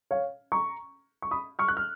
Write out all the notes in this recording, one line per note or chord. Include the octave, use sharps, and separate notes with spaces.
C#5 F5
A#5 C#6
C#6
B5 D#6
C#6 F6
F#6
F6